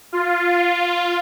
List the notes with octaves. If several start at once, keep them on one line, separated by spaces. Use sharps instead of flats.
F4